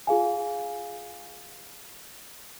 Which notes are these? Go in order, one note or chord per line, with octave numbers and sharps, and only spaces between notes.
F4 G#4 F5 G#5